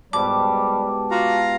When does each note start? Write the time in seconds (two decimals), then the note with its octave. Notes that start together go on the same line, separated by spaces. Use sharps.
0.13 G#2 B2 G3 G4 A5 D6
1.11 F4 F#4 F5 A#5